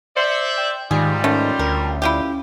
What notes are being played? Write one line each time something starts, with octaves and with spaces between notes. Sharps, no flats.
C5 D5 E5 C#7
G5
G#2 D#3 G3 F4 G#4
D#3 A3 C#4
D2 A#4
E4 F4 G4